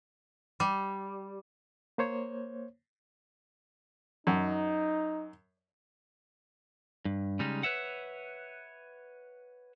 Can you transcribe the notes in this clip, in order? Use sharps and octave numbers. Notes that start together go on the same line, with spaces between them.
G3
A#3 C5 C#5
F#2 D#4
G2
C#3 G3 G#3 D#4
B4 C#5 E5 F#5